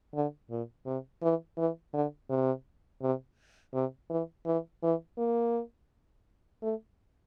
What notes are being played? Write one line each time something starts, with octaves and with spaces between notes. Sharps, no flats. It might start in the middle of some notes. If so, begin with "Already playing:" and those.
D3
A#2
C3
E3
E3
D3
C3
C3
C3
E3
E3
E3
A#3
A3